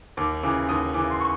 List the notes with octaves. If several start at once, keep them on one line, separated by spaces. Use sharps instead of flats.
D#2 D6
C#3 E3 D6
D#2 D#6
C#3 E3 D6
C6
C#6